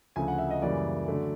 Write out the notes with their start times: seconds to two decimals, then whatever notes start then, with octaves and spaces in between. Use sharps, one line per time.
0.16 D2 C#3 F3 A3 G#5
0.28 F#5
0.38 E5
0.51 D#5
0.62 F#2 C#3 E3 G3 A#3 D5
1.07 D3 F#3 A3